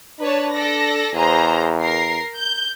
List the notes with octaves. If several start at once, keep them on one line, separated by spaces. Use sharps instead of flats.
D4 B4 C#5 A5
A4 D5 A#6
E2 G#4 C5 A#5
A#4 C7
G6